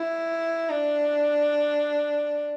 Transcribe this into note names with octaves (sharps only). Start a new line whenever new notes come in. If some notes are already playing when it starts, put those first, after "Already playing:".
Already playing: E4
D4